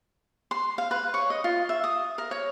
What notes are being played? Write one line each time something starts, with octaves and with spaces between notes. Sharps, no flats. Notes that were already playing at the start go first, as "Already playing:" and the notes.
C6
F5
B4
C#5
D#5
F4
E5
D#6
A#4
C#5